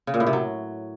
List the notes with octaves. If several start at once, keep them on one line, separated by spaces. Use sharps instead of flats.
C#3
A#2
A2
C3
F#3